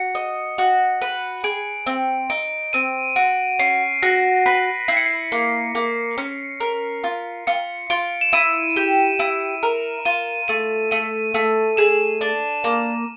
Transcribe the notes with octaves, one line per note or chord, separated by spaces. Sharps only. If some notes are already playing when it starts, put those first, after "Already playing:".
Already playing: F#4 C#7
D#5
F#4
B4
G#4 D7
C4
D#4 D7
C4 D#7
F#4 D7
C#4 C7
F#4 A#6
B4 B6
E4 C7
C#7
C7
A#3
A#3
C#4
A#4
F4
F4 C#7
F4 D7
E7
E4 D#7
G4
E4
A#4
F4 D#7
A3 D#7
A3 D#7
A3
G#4 E7
D4
A#3